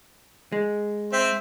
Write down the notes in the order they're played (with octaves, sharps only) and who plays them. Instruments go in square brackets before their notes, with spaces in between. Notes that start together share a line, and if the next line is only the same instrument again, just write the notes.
[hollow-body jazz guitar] G#3
[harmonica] C4 [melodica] C5 E5